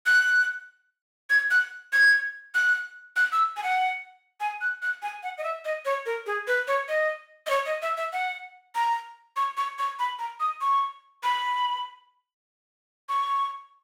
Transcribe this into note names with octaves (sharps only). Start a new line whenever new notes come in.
F#6
G#6
F#6
G#6
F#6
F#6
E6
G#5
F#5
G#5
F#6
F#6
G#5
F#5
D#5
E5
D#5
C#5
A#4
G#4
B4
C#5
D#5
D#5
C#5
D#5
E5
E5
F#5
A#5
C#6
C#6
C#6
B5
A#5
D#6
C#6
B5
C#6